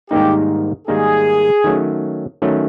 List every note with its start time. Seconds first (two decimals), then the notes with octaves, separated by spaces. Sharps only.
0.11 G#2 D#3 G3 A#3 D#4 G4
0.88 G#2 D#3 G3 A#3 D#4 G#4
1.64 D#3 F#3 A3 C#4
2.42 D#3 F#3 A3 C#4